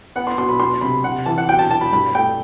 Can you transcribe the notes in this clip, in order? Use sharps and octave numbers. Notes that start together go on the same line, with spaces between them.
B3 F#5
C6
B2 C6
B5
B3 C6
C3 B5
C3 F#5
E3 A5
F#5
B2 G5
A5
B2 A5
B5
G2 B5
A3 G5